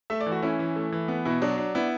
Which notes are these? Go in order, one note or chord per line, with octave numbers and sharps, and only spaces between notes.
A3 E5
D5
E3
F#4
C#4 E4
E3
A3
E3
B3
B2 E4
F#3 D4
D4
B3 E4